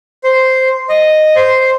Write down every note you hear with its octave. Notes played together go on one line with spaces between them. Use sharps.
C5
D#5
C5